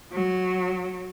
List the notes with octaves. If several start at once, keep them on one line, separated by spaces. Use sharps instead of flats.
F#3